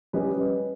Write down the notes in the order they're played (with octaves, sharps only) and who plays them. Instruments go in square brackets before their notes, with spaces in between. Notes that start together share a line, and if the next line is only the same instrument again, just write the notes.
[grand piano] G3 C#4 G4 B4 D#5